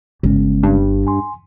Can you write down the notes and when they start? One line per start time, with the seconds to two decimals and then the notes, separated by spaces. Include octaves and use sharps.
0.23 G1 C#3 G#3 C#4
0.63 G2
1.07 G#5 C6